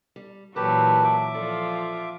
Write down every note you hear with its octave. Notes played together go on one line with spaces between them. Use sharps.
G3
A#2 E3 F#3 G4 A#4 B4 A5
E5 D6
F3 F4 A4 D5